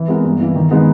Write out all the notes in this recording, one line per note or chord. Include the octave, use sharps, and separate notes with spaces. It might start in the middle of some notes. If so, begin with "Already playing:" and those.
Already playing: E3
G#3 B3 E4 A#4
G2
E3 A#3 E4
D#3
G#3 B3 D#4